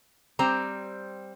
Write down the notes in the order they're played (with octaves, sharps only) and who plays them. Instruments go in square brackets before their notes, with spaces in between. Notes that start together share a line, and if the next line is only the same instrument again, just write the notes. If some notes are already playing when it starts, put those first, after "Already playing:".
[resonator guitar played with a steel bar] G3 C4 C5 A#5